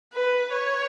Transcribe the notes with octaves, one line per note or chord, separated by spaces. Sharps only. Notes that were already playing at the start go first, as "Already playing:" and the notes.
B4
C#5